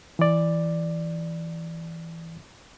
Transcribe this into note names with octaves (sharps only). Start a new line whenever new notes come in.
E3 D5